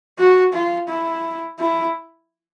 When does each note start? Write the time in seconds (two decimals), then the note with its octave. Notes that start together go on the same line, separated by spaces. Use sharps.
0.19 F#4
0.53 F4
0.89 E4
1.60 E4